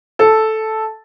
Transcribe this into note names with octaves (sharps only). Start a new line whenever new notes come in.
A4